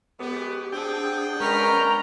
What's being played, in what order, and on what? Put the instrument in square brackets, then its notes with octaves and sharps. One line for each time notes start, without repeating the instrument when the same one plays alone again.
[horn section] F#2 G#3 B3 [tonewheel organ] G4
[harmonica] C4 [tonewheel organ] D4 G#4 [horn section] F#5 G5
[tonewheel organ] G#3 C#4 [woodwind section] D4 A#4 A#5 [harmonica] B4 C#6 F6